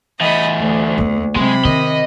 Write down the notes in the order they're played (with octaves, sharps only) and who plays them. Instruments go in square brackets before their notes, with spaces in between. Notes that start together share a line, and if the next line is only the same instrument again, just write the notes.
[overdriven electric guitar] E2 A3 [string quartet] D#5 B5
[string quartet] D2
[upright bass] E2 A#3
[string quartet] C3 B5 [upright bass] F#3 [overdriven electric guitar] G#3
[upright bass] D#3 [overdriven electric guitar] D#5